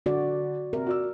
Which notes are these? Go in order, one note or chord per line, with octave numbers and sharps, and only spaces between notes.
D3 F#4 D5
C3 A#4
F#4 D5 E6